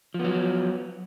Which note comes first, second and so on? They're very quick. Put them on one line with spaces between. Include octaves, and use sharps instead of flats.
F3 B3 F#3